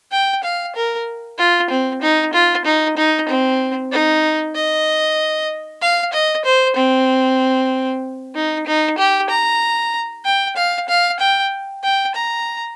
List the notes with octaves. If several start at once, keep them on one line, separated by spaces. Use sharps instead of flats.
G5
F5
A#4
F4
C4
D#4
F4
D#4
D#4
C4
D#4
D#5
F5
D#5
C5
C4
D#4
D#4
G4
A#5
G5
F5
F5
G5
G5
A#5